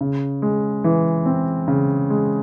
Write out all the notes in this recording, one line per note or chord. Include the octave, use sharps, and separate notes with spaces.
C#3
G#3
E3
C4
C#3
G#3